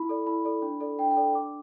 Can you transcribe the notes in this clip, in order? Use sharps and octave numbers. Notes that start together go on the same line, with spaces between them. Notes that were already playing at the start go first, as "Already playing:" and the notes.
Already playing: E4 B5
A4 D5
E4 B5
A4 D5
D4
A4 D5
D4 G5
G5
A4 D5
D4 D6